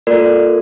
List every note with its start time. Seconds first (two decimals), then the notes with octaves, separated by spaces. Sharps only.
0.07 A#3 F4 A4 A#4 D5